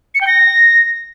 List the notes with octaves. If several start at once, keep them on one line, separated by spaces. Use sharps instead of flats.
C#7
G5
A#6